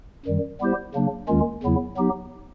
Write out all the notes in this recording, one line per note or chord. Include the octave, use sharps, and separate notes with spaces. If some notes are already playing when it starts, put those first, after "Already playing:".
F#2 D#3 G3
G3 B3 E4 G4 C5
C#3 F#3 A#3 D4
D#2 D#3 G#3 C#4 F4
E2 C#3 F#3 B3 E4
F#3 B3 D#4 G4